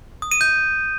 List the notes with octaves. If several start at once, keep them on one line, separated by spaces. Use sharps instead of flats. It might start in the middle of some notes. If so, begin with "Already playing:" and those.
D#6
D#7
G6